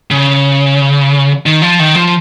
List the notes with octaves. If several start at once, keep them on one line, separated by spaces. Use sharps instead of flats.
C#3
D#3
F3
D#3
F3